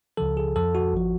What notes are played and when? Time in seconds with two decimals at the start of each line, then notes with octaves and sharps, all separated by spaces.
0.17 C#2 C#3 F3 A4
0.37 G#4
0.55 F2 F3 A4
0.75 F#4
0.93 G#1 F3